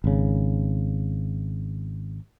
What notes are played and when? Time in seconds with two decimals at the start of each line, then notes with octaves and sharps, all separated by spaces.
0.04 G#1 C#3